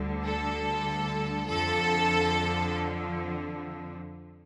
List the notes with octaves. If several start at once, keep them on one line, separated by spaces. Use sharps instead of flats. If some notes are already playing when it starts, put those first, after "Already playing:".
Already playing: D2 D3 G3
A4
F2 D3 F3 A4